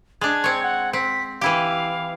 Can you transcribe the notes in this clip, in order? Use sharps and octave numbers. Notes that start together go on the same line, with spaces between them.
G#3 D4 G#6
C4 C#5
F#5
C4 B6
E3 E4 G4 F5